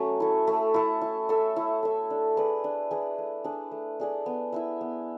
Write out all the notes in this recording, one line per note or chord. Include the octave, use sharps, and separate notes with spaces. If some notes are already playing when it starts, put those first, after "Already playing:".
Already playing: F#3 A3 C#4 F#4
E4 A4
A3
E4 A4
E4
A4 E5
E4
A4 E5
D4
G#4 B4 D5
D4
G#4 B4 D5
A3
D4 G#4 D5
A3
D4 G#4 D5
B3
E4 B4 E5
B3